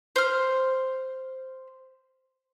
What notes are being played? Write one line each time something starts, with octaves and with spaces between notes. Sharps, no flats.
C5 F6